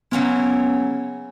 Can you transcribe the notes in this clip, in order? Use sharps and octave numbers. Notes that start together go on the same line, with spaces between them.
C#3 F#3 A#3 B3 C#4 E4